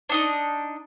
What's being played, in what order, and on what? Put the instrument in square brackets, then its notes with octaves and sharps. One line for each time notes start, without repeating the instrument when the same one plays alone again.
[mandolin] D4 D#4 D#5